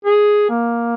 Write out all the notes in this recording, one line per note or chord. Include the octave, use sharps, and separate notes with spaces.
G#4
A#3